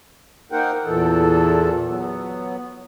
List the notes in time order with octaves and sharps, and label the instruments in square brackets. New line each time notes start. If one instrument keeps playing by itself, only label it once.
[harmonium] A#3 D#4 A#4 C5 F#5 G5
E2 A#2 E3 A4
F#3 B3